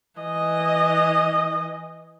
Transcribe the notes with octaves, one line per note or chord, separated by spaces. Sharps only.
E3 D#5